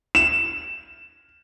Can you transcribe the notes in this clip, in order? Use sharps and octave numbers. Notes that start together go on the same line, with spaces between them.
E7